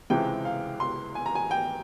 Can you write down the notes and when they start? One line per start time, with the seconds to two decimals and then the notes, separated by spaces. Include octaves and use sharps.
0.10 C#2 C3 E3 G#3 G5
0.45 F5
0.80 C6
1.15 G#5
1.26 A#5
1.35 G#5
1.51 G5